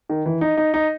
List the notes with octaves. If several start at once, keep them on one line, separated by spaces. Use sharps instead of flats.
D#3
E3
D#4
D#4
D#4